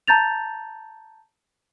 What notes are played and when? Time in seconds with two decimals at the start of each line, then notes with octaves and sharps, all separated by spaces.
0.07 A5 A#5 G6 A6 F7